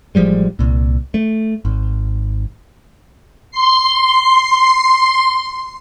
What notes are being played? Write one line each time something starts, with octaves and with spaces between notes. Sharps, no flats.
A1 F3 G3 G#3
C2 A#2
A3
G#1
C6 C7